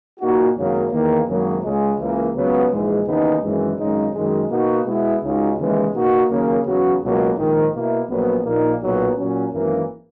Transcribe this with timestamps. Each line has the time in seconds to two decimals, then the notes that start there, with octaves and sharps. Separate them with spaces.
0.19 A#2 A#3 D#4 F#4
0.56 G#1 F#2 C#3 F#3 A#3
0.92 E2 D#3 A#3
1.27 G#1 F#2 C#3 F#3 A#3
1.63 C#2 C#3 G#3
1.99 C#2 C#3 E3 A#3
2.34 C#2 C#3 F#3 B3
2.71 A#1 G#2 E3 G#3
3.06 D#2 C#3 E3 B3 D#4
3.42 G#1 F#2 E3 G#3
3.78 G#1 F#2 C#3 G#3 D#4
4.14 F#2 D#3 G#3
4.50 B2 A#3 D#4 F#4
4.86 B2 G#3 B3 E4
5.22 C#2 C#3 G#3 D#4 F#4
5.57 D#2 C#3 E3 G#3
5.93 B2 A#3 D#4 F#4
6.29 D#2 C#3 F#3 A#3
6.65 E2 C#3 F#3 B3 F#4
7.01 C#2 B2 F#3 A#3
7.37 A#1 G#2 D#3
7.74 B2 A#3 E4
8.09 A#1 A#2 F#3 B3
8.44 A#1 A#2 A#3 D#4
8.81 B1 A#2 F#3 B3 F#4
9.16 A#2 F#3 C#4
9.52 G#1 F#2 E3 A#3